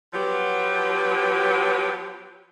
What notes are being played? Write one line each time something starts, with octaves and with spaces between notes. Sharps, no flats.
F3 F#3 B3 G4